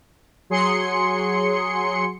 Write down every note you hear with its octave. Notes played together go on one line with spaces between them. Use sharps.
F#3 G#4 C6 C#7